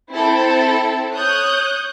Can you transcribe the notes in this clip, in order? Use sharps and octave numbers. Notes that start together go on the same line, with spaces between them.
C4 E4 A4
C#5 D#6 F#6 G6